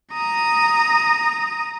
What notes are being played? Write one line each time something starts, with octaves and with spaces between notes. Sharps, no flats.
A#5 D#6